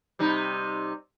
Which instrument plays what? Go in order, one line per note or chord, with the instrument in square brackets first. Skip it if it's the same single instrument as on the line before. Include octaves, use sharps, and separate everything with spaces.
[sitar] C3 G3 D#4